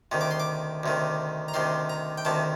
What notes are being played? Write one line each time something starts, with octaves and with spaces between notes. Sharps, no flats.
D2 C3 D#3
D6
C6
D6
D2 C3 D#3
A#5
D2 C3 D#3 C6
A#5
G5
D2 C3 D#3 A5